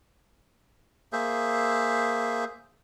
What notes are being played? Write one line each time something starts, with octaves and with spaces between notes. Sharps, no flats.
A#3 G#4 C5 E5